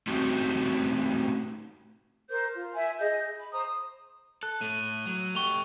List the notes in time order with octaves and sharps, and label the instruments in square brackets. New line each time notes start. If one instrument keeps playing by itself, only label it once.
[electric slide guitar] A3 C4 C#4 D#4 F#4 G4
[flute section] A#4 C5 D6 G6
F4
E5 G#5
G#4 D#5 G6
B5
C5 A#5 D#6
[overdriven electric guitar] A4 [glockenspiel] F#6
[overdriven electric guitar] A2 [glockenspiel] D#7
[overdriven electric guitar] F#3 [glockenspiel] D#7
[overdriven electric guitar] A3 G4 [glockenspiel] C#6 F7